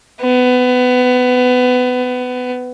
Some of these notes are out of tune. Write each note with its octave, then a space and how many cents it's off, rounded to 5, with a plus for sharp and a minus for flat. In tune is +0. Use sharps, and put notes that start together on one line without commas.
B3 +20